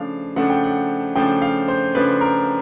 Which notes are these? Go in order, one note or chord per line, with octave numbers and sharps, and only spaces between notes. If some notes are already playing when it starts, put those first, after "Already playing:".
Already playing: C#3 F3 A3 D4 F5
C#3 F3 A3 D4 F#5
G5
F#5
C#3 F3 A3 D4 G5
F5
C5
C#3 F3 A3 D4 B4
A#4